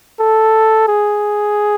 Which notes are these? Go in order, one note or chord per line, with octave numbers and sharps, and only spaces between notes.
A4
G#4